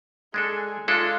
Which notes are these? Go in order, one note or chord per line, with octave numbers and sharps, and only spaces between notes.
G#3 D4 G#4 A4
G#3 D4 F4 A4